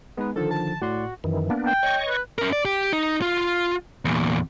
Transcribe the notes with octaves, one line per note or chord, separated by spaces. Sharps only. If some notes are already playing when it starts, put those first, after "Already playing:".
G#3 B3 D#4 B4
D3 D#3 F3 A4
A5
A2 F#4 D5 C6
F#2 D#3 E3
A#3 B3 D4
G5
C#5 D#5 C#6
B4
C#4 A#4
D5
G4
D#4
F4
E2 A#2